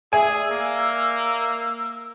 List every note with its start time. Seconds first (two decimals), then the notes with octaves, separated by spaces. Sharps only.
0.13 G#4 D5 E5 G#5 E6
0.51 A#3